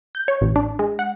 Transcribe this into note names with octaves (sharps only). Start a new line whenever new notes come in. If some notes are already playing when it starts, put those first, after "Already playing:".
G6
C#5
A1
D4
G#3
F#5